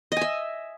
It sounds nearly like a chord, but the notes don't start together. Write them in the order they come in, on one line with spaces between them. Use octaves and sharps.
D#5 G#5 E5